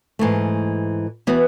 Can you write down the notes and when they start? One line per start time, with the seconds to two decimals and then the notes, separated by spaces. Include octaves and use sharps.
0.19 G#2 E3 A3
1.27 E3 B3 F#4 B4